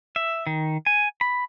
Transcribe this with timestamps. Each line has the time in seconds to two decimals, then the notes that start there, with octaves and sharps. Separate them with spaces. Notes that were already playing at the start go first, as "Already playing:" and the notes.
0.16 E5
0.47 D#3
0.86 G#5
1.21 B5